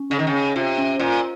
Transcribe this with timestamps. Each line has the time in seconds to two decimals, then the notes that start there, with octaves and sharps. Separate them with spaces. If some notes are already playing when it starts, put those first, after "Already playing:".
Already playing: C#4
0.10 C#3 C#4
0.19 D#3
0.27 C#3
0.34 C#4
0.56 C3 F4
0.78 C#4
1.00 A#2 F4